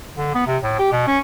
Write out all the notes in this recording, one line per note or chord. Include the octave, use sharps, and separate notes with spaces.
D3
B3
C3
A2
G4
B2
C#4